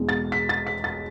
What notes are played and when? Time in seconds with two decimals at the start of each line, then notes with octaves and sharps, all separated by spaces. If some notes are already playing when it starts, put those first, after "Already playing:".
Already playing: E2 B2 G#3
0.09 A6
0.32 B6
0.49 A6
0.67 B6
0.84 A6